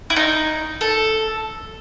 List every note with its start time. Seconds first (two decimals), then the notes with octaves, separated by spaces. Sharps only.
0.10 E4
0.16 D#4
0.81 A4